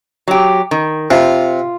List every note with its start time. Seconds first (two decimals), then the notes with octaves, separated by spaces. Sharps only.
0.28 F#3 G4
0.71 D#3
1.11 C3 F4